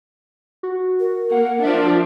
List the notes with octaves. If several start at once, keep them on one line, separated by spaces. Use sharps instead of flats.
F#4
A#4
A#3 F#5
F3 D4 E5